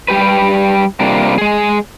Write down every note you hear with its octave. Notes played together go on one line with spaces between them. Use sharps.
G3 G4 B4
C3 G3 A#3 D4 F4
G#3 G#4